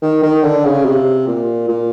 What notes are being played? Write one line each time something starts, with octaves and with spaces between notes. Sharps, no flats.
D#3
D#3
D3
C#3
C3
A#2
A#2